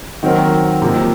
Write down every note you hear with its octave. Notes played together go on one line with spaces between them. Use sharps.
D#3 F#3 C4 F#4 A#4
C3 F3 A#3